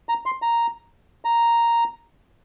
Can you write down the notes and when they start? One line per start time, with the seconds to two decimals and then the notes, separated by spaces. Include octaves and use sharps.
0.09 A#5
0.26 C6
0.42 A#5
1.25 A#5